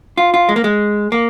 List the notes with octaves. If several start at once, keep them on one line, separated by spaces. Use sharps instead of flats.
F4
F4
G#3
A#3
G#3
A#3